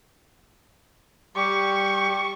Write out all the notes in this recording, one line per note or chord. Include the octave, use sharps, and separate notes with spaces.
G3 G4 C#6